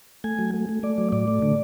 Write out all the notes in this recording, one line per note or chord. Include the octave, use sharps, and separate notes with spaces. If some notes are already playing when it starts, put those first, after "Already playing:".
A3 G#5
F#3
A3
A3
A3 D5
F#3
A2 D5
A3
D3